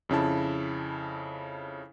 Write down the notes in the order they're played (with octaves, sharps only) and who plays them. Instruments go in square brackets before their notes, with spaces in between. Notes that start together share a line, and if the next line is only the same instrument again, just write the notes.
[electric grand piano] F2 C#3 E4 A5